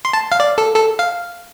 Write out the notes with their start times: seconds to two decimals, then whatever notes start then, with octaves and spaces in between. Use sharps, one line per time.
0.05 C6
0.13 A5
0.32 F5
0.40 D5
0.58 A4
0.76 A4
0.99 F5